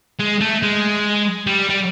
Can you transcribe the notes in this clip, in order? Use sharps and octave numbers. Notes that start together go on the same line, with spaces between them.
G#3
A3
G#3
G3
G3